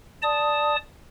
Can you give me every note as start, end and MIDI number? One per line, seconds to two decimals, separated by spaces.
0.22 0.76 74
0.22 0.76 81
0.22 0.76 87